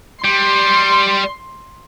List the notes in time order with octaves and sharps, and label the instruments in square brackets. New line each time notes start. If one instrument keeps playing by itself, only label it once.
[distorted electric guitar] G3 [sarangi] C6